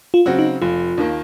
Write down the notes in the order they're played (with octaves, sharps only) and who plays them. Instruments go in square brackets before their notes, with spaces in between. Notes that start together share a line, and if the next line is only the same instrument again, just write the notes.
[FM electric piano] F4
[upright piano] C#3 F#3 C4 F#4
[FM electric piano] D#4
[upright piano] F1 [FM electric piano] F4
[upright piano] D#2 D#3 A#3